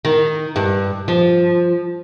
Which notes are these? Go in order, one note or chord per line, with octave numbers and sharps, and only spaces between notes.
D#3
G2
F3